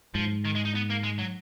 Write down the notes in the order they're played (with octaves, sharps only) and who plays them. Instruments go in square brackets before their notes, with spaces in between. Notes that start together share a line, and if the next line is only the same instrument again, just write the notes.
[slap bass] G#2 [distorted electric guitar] F3
[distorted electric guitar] D#3
G#3
D#4
B3
A#3
G#3
F#3